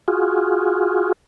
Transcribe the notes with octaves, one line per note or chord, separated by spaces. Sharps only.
F4 F#4 G#4